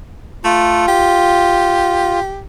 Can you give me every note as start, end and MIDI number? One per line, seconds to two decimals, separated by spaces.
0.44 0.87 57
0.44 2.20 65
0.88 2.41 67